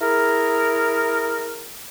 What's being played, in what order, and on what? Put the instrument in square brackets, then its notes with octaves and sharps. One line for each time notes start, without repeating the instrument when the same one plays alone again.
[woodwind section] E4 G#4 A#4